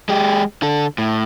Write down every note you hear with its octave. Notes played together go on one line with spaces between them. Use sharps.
G#3 G4
D3 A4
A2